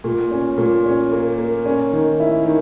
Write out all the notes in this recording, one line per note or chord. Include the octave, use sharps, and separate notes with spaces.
A#2
C#4
A#2
C#4
A#3
A#3
C#4
D#3
E4
D#3